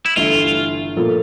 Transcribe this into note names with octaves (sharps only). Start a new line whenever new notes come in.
E4
G1 G2 E3 A3 E4 F4
A#2 F3 A#3 F4 A4